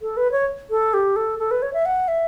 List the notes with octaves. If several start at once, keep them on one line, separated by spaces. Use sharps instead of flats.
A4
B4
C#5
A4
G4
A4
A4
B4
C#5
E5
F#5
E5